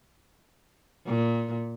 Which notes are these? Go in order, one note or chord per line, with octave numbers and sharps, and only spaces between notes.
A#2